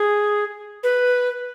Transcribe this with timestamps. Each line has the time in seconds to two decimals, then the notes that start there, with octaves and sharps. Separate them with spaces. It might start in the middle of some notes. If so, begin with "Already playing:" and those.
Already playing: G#4
0.83 B4